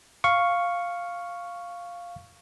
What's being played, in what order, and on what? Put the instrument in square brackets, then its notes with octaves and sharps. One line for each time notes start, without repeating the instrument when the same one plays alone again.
[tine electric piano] F5 C#6